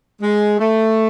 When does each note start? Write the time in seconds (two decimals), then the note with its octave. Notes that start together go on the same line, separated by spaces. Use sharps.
0.21 G#3
0.58 A3